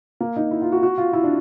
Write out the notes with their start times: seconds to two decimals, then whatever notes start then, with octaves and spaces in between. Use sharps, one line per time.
0.21 A#3
0.36 D#4
0.51 E4
0.62 F4
0.72 F#4
0.83 F#4
0.98 F4
1.13 E4
1.24 D4